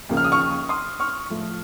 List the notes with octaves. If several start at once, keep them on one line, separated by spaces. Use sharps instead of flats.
D#2 C#3 F3 A#3
F6
D#6
C#6 F6
C6 D#6
C#6 F6
A2 F3 A3